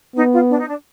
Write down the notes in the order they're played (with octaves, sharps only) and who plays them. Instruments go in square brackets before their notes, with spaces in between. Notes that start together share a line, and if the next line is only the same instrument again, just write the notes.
[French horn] B3 [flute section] D#4
[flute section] F4
D4
D#4
D4